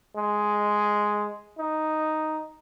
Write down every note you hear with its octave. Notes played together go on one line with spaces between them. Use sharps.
G#3
D#4